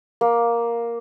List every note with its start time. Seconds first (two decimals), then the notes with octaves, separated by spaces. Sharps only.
0.21 A#3